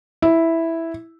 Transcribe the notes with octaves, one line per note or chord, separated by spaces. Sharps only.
E4